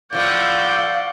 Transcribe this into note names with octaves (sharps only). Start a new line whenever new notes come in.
A2 F3 A3 D5 F5 F#5 G6